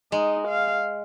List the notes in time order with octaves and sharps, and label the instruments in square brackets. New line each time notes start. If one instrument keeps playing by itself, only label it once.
[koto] G#3 [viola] D#4
[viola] F5